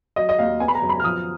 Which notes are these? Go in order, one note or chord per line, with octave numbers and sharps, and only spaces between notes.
F#3 D#5
D#5
D#2 F5
B3 G#5
B5
A#5
F#2
B5
F6
F3 D#6